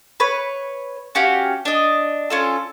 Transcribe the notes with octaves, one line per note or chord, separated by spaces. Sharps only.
B4 C#5
C#4 F#4 G4 F5
D4 D#5
C#4 F4 A4